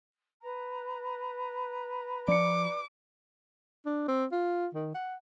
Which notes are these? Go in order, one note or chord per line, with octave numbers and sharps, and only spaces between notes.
B4 A#5
F3 D5 D6 C#7
D4
C4
F4
D#3
F#5